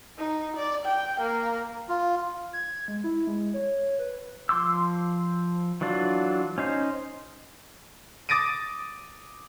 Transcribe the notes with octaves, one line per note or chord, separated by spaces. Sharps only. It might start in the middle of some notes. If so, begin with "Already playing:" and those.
D#4
D5
G5
A#3
F4
G#6
G#3
E4
G#3
C#5
B4
F3 C6 D6 E6
E3 F#3 D4 F4
C#4 D#4 C5
D6 D#6 A6 A#6 D7 D#7